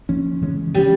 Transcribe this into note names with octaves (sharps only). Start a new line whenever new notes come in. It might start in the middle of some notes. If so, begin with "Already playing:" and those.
F3 A#3 C#4
C#3 E3 G#3 C#4
F3 G3 G#3 C#4